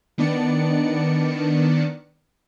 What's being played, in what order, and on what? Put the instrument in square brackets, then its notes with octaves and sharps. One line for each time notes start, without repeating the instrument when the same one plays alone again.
[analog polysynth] D#3 B3 D4 D5 C#7